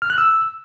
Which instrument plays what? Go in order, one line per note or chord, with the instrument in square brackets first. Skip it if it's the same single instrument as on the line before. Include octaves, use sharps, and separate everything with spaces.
[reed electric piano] F6
F#6
E6